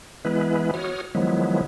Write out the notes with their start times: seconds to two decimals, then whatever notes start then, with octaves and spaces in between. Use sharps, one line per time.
0.25 E3 G#3 B3 E4 B4
0.74 F#4 C#5 D#6 F6
1.15 D#3 F3 F#3 G#3 B3 E4